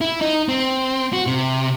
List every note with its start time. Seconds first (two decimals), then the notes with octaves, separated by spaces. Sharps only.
0.01 E4
0.21 D#4
0.48 C4
1.13 F#4
1.27 C3